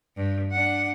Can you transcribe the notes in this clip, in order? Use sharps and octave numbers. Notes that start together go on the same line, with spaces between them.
G2
D4 F#5